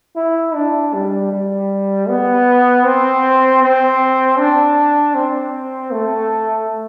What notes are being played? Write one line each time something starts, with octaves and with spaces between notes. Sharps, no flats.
E4
D4
G3
G3
B3
C4
C4
D4
C4
A3